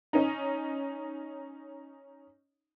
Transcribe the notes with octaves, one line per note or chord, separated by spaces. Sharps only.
C#4 D#4